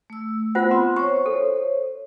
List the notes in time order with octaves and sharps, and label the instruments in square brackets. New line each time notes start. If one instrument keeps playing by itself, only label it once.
[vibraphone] A3 E6
[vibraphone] B3 B5 [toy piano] F4 C5 F#5
[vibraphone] C4 F4 [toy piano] C6
[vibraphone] C5 C#5 [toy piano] C#6
[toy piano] A4